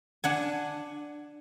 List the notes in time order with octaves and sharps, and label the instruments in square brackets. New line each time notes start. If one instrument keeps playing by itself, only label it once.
[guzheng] D4 F#5 G#5